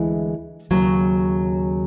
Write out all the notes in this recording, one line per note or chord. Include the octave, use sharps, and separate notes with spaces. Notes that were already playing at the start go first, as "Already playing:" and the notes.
Already playing: D2 E3 G#3
D#2 C#3 F#3